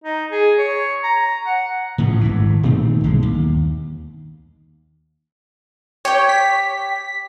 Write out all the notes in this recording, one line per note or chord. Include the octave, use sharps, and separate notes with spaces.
D#4
G#4
C#5
A#5
F#5
A2 C#3 F3
G#1 G2 E3
A#2 D#3 A3 C4
B1 G2 D3 G#3
D#2
G4 C#5 G5
B6